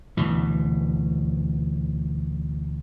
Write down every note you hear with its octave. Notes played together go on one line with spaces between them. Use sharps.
D2 B2 E3